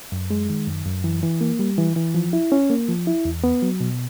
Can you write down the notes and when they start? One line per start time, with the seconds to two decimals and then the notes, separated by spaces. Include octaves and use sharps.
0.12 F#2
0.30 G#3
0.49 D#3
0.68 F#2
0.86 F#2
1.04 E3
1.23 E3
1.41 A#3
1.59 G3
1.78 E3
1.96 E3
2.15 F3
2.33 E4
2.52 C#4
2.70 A#3
2.89 F3
3.07 E4
3.25 E2
3.44 B3
3.62 F#3
3.80 B2